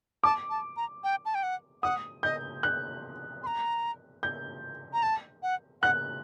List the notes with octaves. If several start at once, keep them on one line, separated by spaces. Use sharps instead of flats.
A5 D6
A5
A#5
G5
A5
G5
F#5
F#5 D#6
D#5 G6
F#6
C6
A#5
G6
A#5
A5
F#5
F#5 F#6